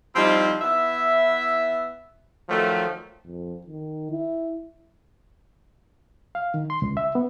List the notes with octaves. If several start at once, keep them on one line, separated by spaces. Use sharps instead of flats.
F3 G3 C4 D#4 E4
B3 E4 E5
D#3 F3 F#3 A3
F2
D#3
E4
F5
D#3
C6
C#2
E5
B3